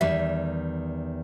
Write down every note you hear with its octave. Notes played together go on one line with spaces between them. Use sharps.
E2 D#3 G3 E5